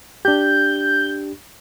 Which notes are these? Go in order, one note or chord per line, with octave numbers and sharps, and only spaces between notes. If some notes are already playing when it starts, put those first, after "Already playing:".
D4 G4 G6